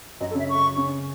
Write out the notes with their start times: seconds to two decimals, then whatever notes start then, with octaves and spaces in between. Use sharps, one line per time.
0.20 F#2 F#3 D#5
0.30 A4
0.35 C#3 C#4 E5
0.49 C#6
0.77 C#3 C#4